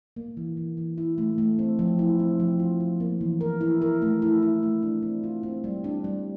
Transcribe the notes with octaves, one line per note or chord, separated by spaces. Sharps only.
A#3
E3
E3
E3
E4
A3
A3
C4
F3
E4
C4
F3
F4
F3
A#3
E3
A#4
E4
A#4
A3
E4
E4
A3
D4
C4
F4
C4
G3
D4
G3